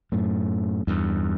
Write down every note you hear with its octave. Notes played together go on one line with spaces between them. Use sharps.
F#2 A2
E2 G2